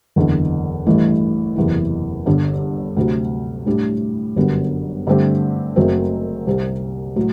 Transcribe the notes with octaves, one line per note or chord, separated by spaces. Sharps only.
F#1 E2 D3
A1 G2 E3 A3
F#1 E2 C3 E3
G1 G2 D3 G3 D4
D2 C3 F#3
A2 G3 D4
G1 F#2 D3 G3 B3
G2 D3 A3 C4 G4
F#1 F#2 F#3 A3 C4
C2 C3 G3
A2 F#3